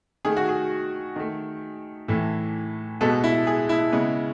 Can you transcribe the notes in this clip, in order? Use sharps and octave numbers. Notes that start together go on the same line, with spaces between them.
D#3 A3 G#4
F#4
G#4
D#3 A3
A2 E3 A3
B2 G#3 B3 A4
E4
G#4
E4
C#3 G#3 B3